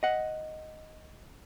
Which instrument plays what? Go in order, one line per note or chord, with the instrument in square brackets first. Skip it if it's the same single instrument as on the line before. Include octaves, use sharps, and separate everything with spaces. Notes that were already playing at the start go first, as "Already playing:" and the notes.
[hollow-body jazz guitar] D#5 F#5